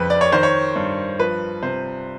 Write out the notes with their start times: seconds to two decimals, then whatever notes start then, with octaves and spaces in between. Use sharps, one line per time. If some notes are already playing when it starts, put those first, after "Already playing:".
Already playing: F2 C#3 B4
0.10 D5
0.21 C#5
0.32 D#3 C5
0.43 C#5
0.76 G2
1.19 F3 B4
1.63 C3 C5